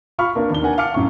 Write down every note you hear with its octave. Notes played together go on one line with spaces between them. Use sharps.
F4 F5 B5 C#6 F6
A#3 D4 A#4
D#2 D4 G7
D4 A#4 F#5 G#5
F5 F#5 A5 D6 F6 C#7
F#2 A2 F5 C#6